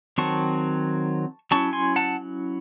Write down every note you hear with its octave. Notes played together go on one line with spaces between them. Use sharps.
D#3 F#3 C4 A5 C#6
F#3 C#4 E4 A5 C#6
G#5 C6
F#5 A5